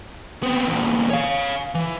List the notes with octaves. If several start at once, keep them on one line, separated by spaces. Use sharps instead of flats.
B3 C4
E2 A#2
C#5 F5
E3